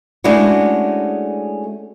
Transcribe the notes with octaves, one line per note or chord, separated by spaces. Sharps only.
G#3 A3 C#4 D4 E4 F#4